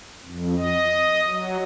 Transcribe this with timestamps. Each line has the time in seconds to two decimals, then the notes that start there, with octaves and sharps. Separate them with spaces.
0.24 F2
0.57 D#5
1.28 F#3